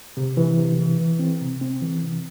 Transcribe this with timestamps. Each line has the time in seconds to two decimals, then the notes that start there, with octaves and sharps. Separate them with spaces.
0.17 C3
0.37 E3
0.58 C3
0.79 E3
1.00 E3
1.19 C4
1.41 C3
1.61 C4
1.82 E3
2.02 C3